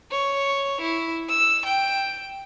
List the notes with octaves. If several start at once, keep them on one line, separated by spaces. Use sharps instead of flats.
C#5
E4
E6
G5